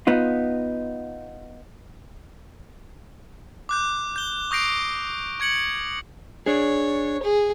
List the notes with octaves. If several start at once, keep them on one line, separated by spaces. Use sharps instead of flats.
B3 D#4 F4
D6 F#6 G6
G6 G7
C#6 D#6 G6 A#6 C7 D7
C#6 G#6 C#7 F#7
D4 G#4 C#5
G#4